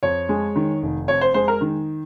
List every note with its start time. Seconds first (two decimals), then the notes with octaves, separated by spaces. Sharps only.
0.03 F2 C#5
0.29 G#3
0.56 D#3
0.83 F1
1.08 F2 C#5
1.21 C5
1.34 G#3 C5
1.48 A#4
1.61 D#3